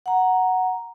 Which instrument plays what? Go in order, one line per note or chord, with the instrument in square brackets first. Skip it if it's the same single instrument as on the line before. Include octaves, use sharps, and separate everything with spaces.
[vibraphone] F#5 A#5